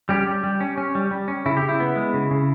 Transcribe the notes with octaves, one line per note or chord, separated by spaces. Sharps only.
G3 C#4 G4
G3
G3
C#4
C#4
G3
G3
C#4
C#3 E4
G4
C#3
E4
B3
G#3
C#3
C#3